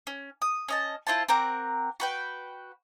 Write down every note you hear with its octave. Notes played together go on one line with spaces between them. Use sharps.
C#4
D#6
C#4 D#5 A5
E4 F4 C5 A5
C4 A#4 F#5 D6
F#4 B4 G5